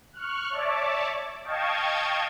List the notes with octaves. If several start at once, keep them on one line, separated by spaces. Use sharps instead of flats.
C#6 F6 F#6
C#5 D5 E5 A5 D6
D#5 F5 G5 A5 C#6 G#6